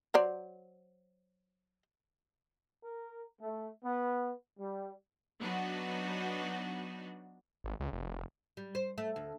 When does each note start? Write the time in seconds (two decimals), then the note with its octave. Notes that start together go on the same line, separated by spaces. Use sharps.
0.14 F#3 C5 D5
2.84 A#4
3.40 A3
3.83 B3
4.58 G3
5.40 F#3 B3 D4 D#4 F#4
7.64 G#1
7.80 C#2
7.93 F1
8.57 G3
8.75 C5
8.98 A3
9.16 D2